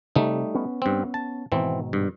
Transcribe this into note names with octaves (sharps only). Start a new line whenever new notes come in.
C3 G3 A3 D#4
B3 C#4
G2 C4
A5
G#2 B2 D#3 E3 C4
G2